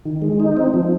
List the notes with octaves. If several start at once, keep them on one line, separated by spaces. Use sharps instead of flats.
D#3
G#3
D#4
C4
F3